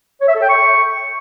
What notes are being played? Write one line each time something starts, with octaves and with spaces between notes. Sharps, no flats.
C#5
E5
A4
G5
C#6